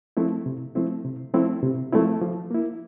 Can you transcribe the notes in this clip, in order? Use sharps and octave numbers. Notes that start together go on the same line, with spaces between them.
F3 A3 C4 E4
C3
F3 A3 C4 E4
C3
F3 A3 C4 E4
C3
F3 A3 C4 E4
F3
A#3 E4